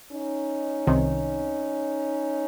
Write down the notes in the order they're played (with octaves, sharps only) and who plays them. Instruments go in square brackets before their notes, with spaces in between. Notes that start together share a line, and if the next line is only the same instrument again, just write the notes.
[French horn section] C#4 D#4
[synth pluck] C2 C3 D#3